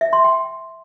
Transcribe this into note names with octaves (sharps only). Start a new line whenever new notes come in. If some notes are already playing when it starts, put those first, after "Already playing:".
E5
C6
G5